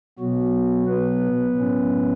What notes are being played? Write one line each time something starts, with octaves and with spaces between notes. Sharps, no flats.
B2 F#3 B3 F#4
B3 B4
A2 F#3 C#4